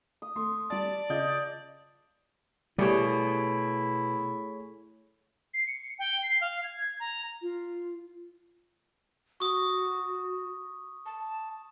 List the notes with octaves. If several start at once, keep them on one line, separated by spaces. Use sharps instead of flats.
D#6
A3 C6
G3 D5 A5 A6
C#3 F4 D#5 G6
B2 G3 A3 E4 G4 G#4 C#5
C7
C#7
G5
C7
F5
G#6
A#5
F4
F#4 C#6 D#6
A5